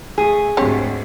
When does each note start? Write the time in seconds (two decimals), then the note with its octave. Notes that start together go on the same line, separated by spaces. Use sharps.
0.18 A3 G#4
0.57 D2 G#2 C4 G4 C#5